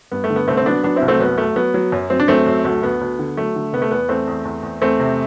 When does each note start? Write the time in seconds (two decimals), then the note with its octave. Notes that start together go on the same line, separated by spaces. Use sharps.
0.11 G2 B3
0.24 A3
0.30 D3
0.36 B3
0.47 C2 A3 C4
0.57 C4
0.66 F#3 B3 D4
0.83 F#3 B3 D4
0.96 C4 E4
1.02 C2
1.08 A3 C4
1.20 F#2 B3
1.38 F#3 A3
1.56 F#3 B3
1.74 F#3
1.92 F#2
2.10 F#3 C4
2.20 D4
2.28 F#2 A3 C4
2.46 F#2
2.64 D2 A3
2.83 D2 B3
3.01 D2
3.19 D3
3.37 F#3 A3
3.56 D3
3.73 C3 B3
3.82 A3
3.91 E2 B3
4.09 E2 A3 C4
4.27 E2
4.45 E2
4.63 E2
4.81 E2 A3 C4
5.00 C3